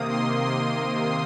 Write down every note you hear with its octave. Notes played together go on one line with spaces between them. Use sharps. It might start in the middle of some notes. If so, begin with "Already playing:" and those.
Already playing: C3 D#3 A#3 D#6
C6
C6